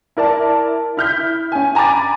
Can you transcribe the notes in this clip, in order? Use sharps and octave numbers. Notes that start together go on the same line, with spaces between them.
E4 A#4 D5 A5
E4 F6 G6 B6
C#4 G#5
G#5 A#5 B5 D6 A6